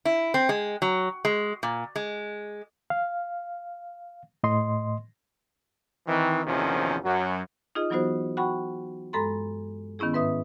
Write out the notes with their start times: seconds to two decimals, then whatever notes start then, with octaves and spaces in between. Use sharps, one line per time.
0.05 E4
0.34 C4
0.49 G#3
0.82 F#3
1.25 G#3
1.63 A#2
1.96 G#3
2.90 F5
4.43 A2 D#5 C6
6.07 D#3 E3 C4
6.45 A#1 E2 C3 D#3 F3 C#4
7.04 F#2 F#3
7.75 D#4 F4 G#4 D#5
7.90 E3 F#3 B3 D#4 F#4 C5
8.37 F#4 F#5 G5 B5 C#6
9.13 G2 G#3 A4 A#5 C6
9.99 D#3 B3 C#4 E4 G#4
10.13 G#2 B4 E5 D#6